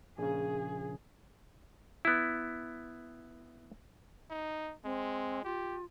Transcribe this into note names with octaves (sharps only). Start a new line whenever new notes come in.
A#1 C#3 G#4
B3 E4
D#4
G#3 C4
F4 G4